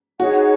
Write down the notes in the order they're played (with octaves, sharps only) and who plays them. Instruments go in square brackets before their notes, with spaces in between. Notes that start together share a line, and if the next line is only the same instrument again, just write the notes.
[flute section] D#4 G#4 C#5 F#5 [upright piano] F#4